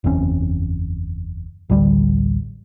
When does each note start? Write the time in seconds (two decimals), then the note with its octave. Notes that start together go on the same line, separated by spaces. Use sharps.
0.04 F#1 E2 C4 C#4
1.70 A1 D2 D3 G3